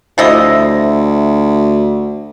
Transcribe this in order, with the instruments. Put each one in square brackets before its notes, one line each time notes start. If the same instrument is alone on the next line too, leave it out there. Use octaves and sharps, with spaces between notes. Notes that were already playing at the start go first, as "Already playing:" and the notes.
[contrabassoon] D2 [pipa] F3 E4 D#5